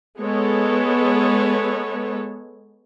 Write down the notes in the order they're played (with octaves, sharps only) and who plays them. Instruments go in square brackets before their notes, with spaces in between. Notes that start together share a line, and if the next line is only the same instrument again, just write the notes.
[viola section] G#3 B3 A4 C#5